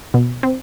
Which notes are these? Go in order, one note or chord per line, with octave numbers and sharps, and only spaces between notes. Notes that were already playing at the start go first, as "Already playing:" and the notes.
B2
C4